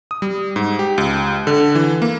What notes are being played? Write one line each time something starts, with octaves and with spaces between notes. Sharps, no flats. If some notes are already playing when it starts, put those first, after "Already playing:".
D#6
G3
G#2
G4
C#2
D3
E3
A#3